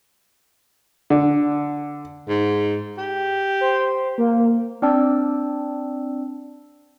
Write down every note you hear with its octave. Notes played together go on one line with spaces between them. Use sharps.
D3
G#2
G4
C5
A#3
C4 D4 D5 G5 A5 E6